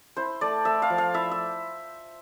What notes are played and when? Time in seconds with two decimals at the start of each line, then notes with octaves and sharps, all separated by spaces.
0.16 E4 C5
0.41 A3 D5
0.65 A3 E5
0.82 F5
0.90 F3
0.98 F5
1.14 E4 E5
1.31 E5